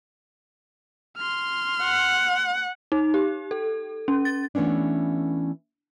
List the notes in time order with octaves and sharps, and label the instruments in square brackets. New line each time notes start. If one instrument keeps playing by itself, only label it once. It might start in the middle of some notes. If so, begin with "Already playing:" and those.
[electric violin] C6 F6
[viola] F#5
[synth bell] D#4
G4
A4
C#4
A6
[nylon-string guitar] E3 A3 B3 C#4 D4